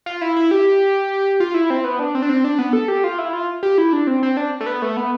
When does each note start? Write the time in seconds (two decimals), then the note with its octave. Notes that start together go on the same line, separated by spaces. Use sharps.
0.06 F4
0.21 E4
0.36 E4
0.51 G4
1.40 F4
1.54 E4
1.70 C4
1.84 B3
1.99 D4
2.15 C4
2.22 D4
2.29 C4
2.44 D4
2.59 B3
2.73 A4
2.88 G4
3.04 F4
3.18 E4
3.33 F4
3.63 G4
3.78 E4
3.93 D4
4.07 C4
4.23 C4
4.37 D4
4.60 A3
4.67 B3
4.82 A3
4.97 B3